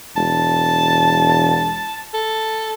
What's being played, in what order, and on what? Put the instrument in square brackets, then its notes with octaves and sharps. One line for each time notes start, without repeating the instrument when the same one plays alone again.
[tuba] E1 [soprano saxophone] A5
[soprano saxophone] A4